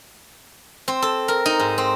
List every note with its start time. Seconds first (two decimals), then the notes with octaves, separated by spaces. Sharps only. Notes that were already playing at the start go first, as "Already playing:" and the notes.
0.88 C4
1.02 A4
1.28 A#4
1.46 D#4
1.59 G#2
1.78 C4